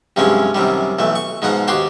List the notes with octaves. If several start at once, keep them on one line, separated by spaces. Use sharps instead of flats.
G2 C3 F3 F#3 G#3 C#4
F#2 C3 D#3 G3
B1 E3 A3
C#6
G#2 B2 F3 D#4 F#5 A#5
D#2 F#4 G4 C5 C6